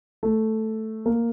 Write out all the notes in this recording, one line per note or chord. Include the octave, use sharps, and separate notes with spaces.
A3
A#3